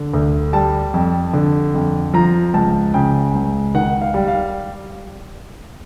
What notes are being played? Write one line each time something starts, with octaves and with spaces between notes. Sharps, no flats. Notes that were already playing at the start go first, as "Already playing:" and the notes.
Already playing: D3
D2
G3 A5
F2
D3
F2
F3 A#5
C#2 A5
C#3 G5
C#2
D#3 F#5
F5
G3
F5